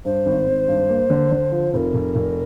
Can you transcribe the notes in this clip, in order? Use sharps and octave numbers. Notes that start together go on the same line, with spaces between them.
G2 C5
G#1
G#1
G2
A#3
D3
D3
F3
F1 A#4 C5
F1
F1